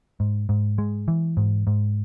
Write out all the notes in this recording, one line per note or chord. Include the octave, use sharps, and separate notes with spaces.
G#2
G#2
G#3
E3
G#2
G#2